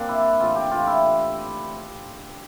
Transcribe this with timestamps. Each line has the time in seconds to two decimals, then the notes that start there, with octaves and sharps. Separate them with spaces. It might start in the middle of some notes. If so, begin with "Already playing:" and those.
Already playing: G2 A#3 C4 D4
0.08 E4
0.40 A2 E3 F4
0.56 G4
0.71 F4
0.87 E4